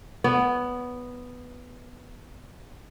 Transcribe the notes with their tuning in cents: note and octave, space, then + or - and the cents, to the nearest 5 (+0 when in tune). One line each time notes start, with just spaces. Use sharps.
B3 +0 D5 -45